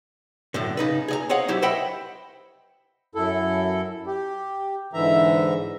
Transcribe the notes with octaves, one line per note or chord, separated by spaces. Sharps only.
F#2 A2 D3
C#3 D#4 B4
G#4 D#5 A#5
C5 C#5 D#5 F5 F#5
F#3 E4 G4 C5
C5 D#5 E5 F#5 G5 B5
F#2 E4 A4
G4
G#2 D3 E3 E5 A#5